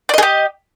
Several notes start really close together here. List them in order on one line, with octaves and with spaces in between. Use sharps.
D5 D#5 G#4 G4